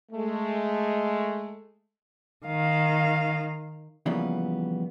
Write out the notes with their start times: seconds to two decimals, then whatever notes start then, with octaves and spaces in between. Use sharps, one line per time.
0.12 G#3 A3
2.46 D#3 F5
4.06 C#3 E3 F3 G3 A#3 B3